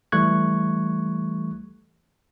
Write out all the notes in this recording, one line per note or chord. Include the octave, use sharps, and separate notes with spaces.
E3 G3 A3 C#6 F#6 G#6